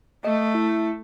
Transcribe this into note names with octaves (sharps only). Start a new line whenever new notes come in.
A3 D#5
E4